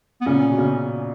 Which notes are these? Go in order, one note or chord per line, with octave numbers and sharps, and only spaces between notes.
B3
A#2 C#3 C#4
B2
C#3